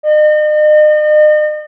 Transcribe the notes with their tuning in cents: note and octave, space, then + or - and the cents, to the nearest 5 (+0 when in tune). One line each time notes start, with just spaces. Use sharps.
D#5 -40